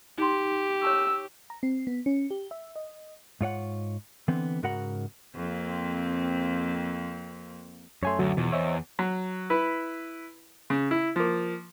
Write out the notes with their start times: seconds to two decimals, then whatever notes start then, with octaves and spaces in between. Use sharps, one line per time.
0.18 D#4 G4 C6
0.83 C#5 A5 C#6 E6
1.50 A#5
1.63 C4
1.87 B3
2.06 C#4
2.31 G4
2.51 E5
2.76 D#5
3.41 G#2 F4 C#5 F#5
4.28 D3 E3 B3 C4
4.63 G#2 C#3 F#4 A#4 F#5 B5
5.35 F2 A#3 C4
8.03 F#2 A3 C#5 G#5 C6
8.19 D2 F#3
8.37 E2 B2 E3 F3
8.53 C5 C#5 D#5 E5
8.99 F#3
9.50 E4 B4
10.70 C#3
10.91 E4
11.16 F3 A#3